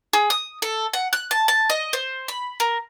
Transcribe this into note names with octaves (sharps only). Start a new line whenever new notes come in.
G#4
D#6
A4
F#5
F#6
A5
A5
D#5
C5
B5
A#4